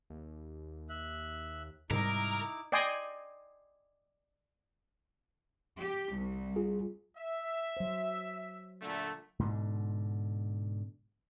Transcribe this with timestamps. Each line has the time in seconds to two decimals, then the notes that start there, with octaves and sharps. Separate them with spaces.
0.10 D#2
0.89 E5 F#6
1.90 G#2 C3 G3 D#4 E4 A#4 D6
2.72 D5 D#5 G5 G#5 C6 D#6
5.78 G4
6.17 C2
6.56 F4 G#4
7.16 E5
7.77 F#3 C5
8.81 A#2 D3 A3
9.39 G#2 B2 D3